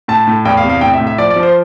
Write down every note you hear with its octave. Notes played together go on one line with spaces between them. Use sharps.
A2 A5
A2
E2 G5
F5
C3
F5
A2 G5
E5
A2
E5
F3 D5
D5
F3
C5